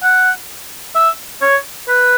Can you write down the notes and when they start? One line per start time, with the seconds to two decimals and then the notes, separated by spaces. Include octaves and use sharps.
0.03 F#5
0.95 E5
1.42 C#5
1.88 B4